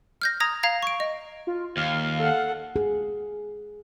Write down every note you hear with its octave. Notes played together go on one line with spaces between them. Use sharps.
F6 G6 A#6
A#5 D#6 G#6 A#6
F5 A#5 G#6
C#6 D7
D#5
F4
D#2 F5
A4 F#5
G#4